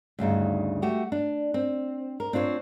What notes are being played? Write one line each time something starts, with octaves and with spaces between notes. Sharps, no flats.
D2 G2 C#3 D#4
A3 F#4 G4
D4
C4
A#4
C4 D4 F4 A#4 C#5